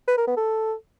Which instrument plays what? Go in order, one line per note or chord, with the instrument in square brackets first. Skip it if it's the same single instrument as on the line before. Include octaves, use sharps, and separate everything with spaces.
[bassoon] B4
A#4
B3
A4